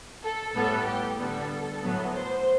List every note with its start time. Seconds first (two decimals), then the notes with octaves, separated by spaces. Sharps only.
0.23 A4
0.55 A2 G3 B3 A4
0.86 G4
1.18 D3 G3 B3 A4
1.82 A2 F#3 B3
2.13 C5